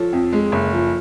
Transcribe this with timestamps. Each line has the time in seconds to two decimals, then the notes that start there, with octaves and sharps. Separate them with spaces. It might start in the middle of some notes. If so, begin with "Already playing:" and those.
Already playing: F3 A4 C#5
0.13 F2
0.32 G#3
0.52 F#1
0.72 F3